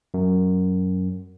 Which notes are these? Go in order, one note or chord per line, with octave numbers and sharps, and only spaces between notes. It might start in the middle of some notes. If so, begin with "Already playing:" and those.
F#2